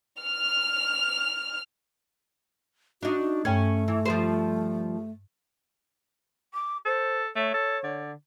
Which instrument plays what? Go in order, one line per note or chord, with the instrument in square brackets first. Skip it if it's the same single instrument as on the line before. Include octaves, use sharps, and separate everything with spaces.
[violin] F6 F7
[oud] D4 D#4 [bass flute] F#4
[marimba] G2 G5 G#6 [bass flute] A3 [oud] C#4
[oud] E3
F3 G3 C5
[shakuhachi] D6
[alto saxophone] A4 [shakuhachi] C5
[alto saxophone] A3 [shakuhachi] C#5
[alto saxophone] A4
D3